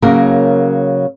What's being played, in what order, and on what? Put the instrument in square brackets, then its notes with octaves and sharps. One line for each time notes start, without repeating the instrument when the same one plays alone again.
[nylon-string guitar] C#3 F#3 A#3 A#4